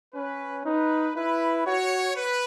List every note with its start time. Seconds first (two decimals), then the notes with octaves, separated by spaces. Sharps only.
0.14 C#4 B4
0.65 D#4 B4
1.16 E4 B4
1.66 F#4 C#5
2.17 B4